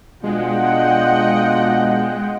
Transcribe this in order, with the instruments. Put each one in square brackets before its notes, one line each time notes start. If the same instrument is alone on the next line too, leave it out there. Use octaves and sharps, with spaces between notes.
[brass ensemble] B2 D4 [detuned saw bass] G#3 [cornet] F4 [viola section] D#5 F#5 G5